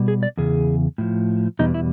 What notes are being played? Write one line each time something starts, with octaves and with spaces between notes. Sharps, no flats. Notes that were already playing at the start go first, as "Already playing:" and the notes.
Already playing: B2 G3
G#4
D5
E2 C#3 G#4
A2 F3
E2 B2 G3 D#4
E4